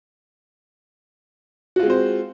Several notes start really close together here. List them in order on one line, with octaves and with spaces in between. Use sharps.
F#4 F4 G#3 C4 C5